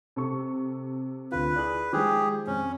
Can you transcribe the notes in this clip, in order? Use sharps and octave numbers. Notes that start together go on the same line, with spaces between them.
C3 A4 C#6
D2 D3 F4 B4
E4 G#4 D5 F#6
D#3 F3 G#3 G4 G#4 E6
F2 C#4